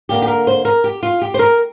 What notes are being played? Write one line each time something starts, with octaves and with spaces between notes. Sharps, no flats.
D3 A#3 D4 G4
G4
A#4
C5
A#4
G4
F4
G4
C5
A#4